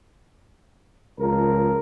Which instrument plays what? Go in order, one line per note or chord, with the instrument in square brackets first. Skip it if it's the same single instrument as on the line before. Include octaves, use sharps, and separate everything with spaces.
[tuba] C#2 [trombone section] F3 A#4